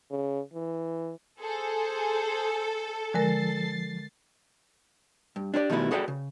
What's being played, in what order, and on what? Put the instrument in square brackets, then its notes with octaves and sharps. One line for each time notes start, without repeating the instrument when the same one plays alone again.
[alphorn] C#3
E3
[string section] G#4 C5 [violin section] A4
[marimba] D3 G#3 A#4 [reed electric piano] F3 [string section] A6 C7
[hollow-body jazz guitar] G2
D4 G4 C5 D5
B2 D#3 G3 A3 E4 B4
F#4 G#4 A4 B4 D5 G5
C#3